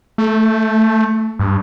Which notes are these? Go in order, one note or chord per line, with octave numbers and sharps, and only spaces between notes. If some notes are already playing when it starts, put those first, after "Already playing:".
A3
G2